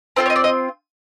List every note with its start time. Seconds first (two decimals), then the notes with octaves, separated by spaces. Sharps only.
0.16 C4 F4 A4 C5
0.26 C#5
0.30 D#5
0.36 D5
0.44 D#5